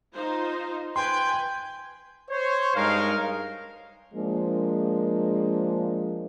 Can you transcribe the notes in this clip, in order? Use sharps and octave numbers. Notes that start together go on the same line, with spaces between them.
D#4 F4 C5
B4 G5 G#5 C6
C5 C#5
G2 G#3 D#4 A#4 C#5 F5
F3 G#3 A#3 D4